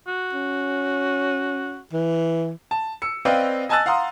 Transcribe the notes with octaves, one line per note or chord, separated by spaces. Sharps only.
F#4
C#4
E3
A5
E6 C#7
C4 B4 D5 D#5 F5 G5
D#5 G#5 A5 E6 F#6 A6
F5 F#5 A#5 C6 D#6